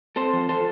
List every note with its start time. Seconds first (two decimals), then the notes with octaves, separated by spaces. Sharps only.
0.16 C4 A4 C5
0.33 F3
0.49 F3 A4 C5